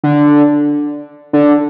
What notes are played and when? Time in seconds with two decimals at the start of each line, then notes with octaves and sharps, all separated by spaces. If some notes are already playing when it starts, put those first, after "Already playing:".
0.03 D3
1.33 D3